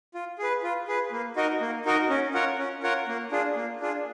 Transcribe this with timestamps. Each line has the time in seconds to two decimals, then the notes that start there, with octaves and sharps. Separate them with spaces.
0.14 F4
0.39 G#4 B4
0.63 F4
0.88 G#4 B4
1.12 A#3
1.36 D#4 F#4 A#4 D#5
1.61 A#3
1.85 D#4 F#4 A#4 D#5
2.10 C#4
2.34 F4 A#4 C#5 F#5
2.59 C#4
2.83 F4 A#4 C#5 F#5
3.08 A#3
3.31 D4 F4 G#4
3.56 A#3
3.81 D4 F4 G#4